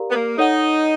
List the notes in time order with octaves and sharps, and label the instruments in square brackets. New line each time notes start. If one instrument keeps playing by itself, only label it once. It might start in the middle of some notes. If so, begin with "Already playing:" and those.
Already playing: [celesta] G4 A#4 D5 F5 A#5
[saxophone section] B3
A#3
[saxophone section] D#4 [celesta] A4 C#5 F#5